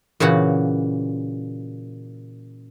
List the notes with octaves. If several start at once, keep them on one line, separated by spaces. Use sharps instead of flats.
A#2 C#3 E3 F#4 F#5